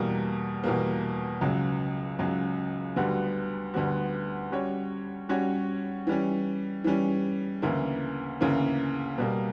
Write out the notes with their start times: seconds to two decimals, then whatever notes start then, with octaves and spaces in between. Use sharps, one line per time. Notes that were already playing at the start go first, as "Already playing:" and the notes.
Already playing: E2 B2 G3 A#3
0.64 E2 B2 G3 A#3
1.41 C#2 C#3 F#3
2.19 C#2 C#3 F#3
2.96 D2 D3 G3 B3 F#4
3.74 D2 D3 G3 B3 F#4
4.52 G3 C#4 F#4 C#5
5.29 G3 C#4 F#4 C#5
6.07 E3 G3 C#4
6.84 E3 G3 C#4
7.62 D2 C#3 E3 A#3 E4
8.40 D2 C#3 E3 A#3 E4
9.18 B2 G3 A#3